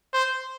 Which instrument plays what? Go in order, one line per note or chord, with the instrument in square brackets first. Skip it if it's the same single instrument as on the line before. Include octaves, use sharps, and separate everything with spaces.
[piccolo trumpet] C5